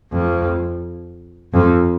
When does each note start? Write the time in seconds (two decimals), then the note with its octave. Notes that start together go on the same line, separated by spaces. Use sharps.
0.12 F2
1.53 F2